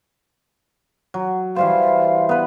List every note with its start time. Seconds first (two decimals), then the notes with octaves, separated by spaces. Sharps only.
1.14 F#3
1.56 E3 G3 C5 F5
2.29 B3 B4